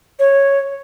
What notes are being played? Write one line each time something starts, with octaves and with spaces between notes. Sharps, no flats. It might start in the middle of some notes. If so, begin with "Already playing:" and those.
C#5